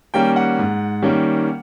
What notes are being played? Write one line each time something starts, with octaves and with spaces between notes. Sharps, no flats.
D#3 G3 A#3 C#4 G5
F#5
G#2
D#3 G3 A#3 C#4